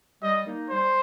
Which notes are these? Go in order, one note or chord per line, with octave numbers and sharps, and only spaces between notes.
G3 D#5
A#3 D#4
G3 C5